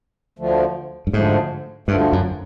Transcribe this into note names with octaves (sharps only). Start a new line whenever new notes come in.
D2 D3 F3 A3
G2
D2 G#2 D3 F3 A3
D2 G2 D3 F3 A3
F#2